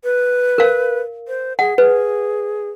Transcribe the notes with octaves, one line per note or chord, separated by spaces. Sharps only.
B4
A#4 F5
C5
G#4 F#5
G#4 B4